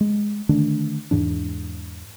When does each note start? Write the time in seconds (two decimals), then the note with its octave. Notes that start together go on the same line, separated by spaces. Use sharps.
0.01 G#3
0.49 D3 D#3 A3 D4
1.11 E2 G#2 E3 D4